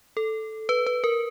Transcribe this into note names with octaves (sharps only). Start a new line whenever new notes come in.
A4
B4
B4
A#4